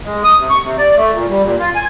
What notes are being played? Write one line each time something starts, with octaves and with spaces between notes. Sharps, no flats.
G#3
D#6
C3
C#6
C3
D5
A3
A#2
G3
A#2
F4
G#5